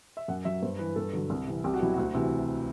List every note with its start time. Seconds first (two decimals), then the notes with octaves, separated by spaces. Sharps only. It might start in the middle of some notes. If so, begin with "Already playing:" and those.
0.17 E5
0.28 F#2 F#5
0.45 F#3 E5
0.62 G2 C5
0.79 E3 B4
0.96 G2 A4
1.13 D3 F#3
1.30 C2
1.47 C3 E3
1.64 C2 G4
1.74 F#4
1.80 B2 F#3 E4
1.94 D2 F#4
2.14 C3 E3